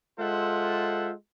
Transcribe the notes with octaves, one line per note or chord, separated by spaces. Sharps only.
G#3 F4 A4 C5 E5 F#5